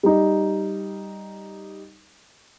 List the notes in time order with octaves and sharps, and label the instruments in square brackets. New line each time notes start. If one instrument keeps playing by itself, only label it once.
[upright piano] G3 D#4